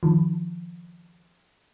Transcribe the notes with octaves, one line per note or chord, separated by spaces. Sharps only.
D#3 F3